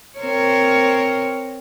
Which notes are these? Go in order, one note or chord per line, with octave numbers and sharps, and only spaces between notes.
C4 A#4 C#5